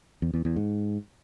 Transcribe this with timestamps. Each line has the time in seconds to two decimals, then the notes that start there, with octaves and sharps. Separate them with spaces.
0.22 E2
0.34 E2
0.45 E2
0.56 G#2